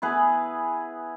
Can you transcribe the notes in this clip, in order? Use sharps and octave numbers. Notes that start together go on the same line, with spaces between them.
B3 E4 G#4 B4